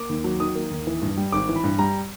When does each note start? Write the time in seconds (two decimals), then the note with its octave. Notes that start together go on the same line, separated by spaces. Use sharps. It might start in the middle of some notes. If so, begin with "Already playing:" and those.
Already playing: A#3 D6
0.09 D#2
0.24 F#3
0.40 D#3 D#6
0.55 A#3
0.71 D#2
0.87 E3
1.02 G2
1.17 G3
1.32 G#1 D6
1.49 E3
1.56 B5
1.64 G2
1.79 G3 A#5